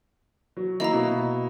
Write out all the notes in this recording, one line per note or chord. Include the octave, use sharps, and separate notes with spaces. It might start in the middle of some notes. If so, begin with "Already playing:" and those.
F#3
A#3 E4 D#5 A#5
B2